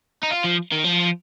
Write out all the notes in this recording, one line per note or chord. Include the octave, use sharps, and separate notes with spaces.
D#4
F4
F3
D#3
F3